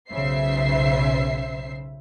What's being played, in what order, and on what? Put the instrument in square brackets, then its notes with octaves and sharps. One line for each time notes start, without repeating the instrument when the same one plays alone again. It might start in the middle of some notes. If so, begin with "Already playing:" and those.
[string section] B1 C#3 C5 E5 C7